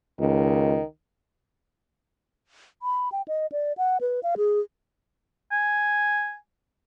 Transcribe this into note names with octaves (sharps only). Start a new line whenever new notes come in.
C#2 D#3
B5
G5
D#5
D5
F#5
B4
F5
G#4
G#5